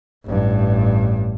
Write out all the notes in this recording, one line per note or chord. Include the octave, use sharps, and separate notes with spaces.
A1 G2